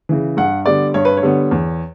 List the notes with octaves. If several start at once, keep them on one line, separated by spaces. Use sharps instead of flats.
C#3 E3
G2 F#5
D3 G3 B3 D5
G2 C#5
B4
C#5
D3 G3 B3
E2